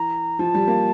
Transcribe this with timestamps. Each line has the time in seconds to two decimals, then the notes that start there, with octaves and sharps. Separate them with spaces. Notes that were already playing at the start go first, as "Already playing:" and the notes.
Already playing: E3 A#5
0.39 F3 A5
0.54 G3
0.68 A#3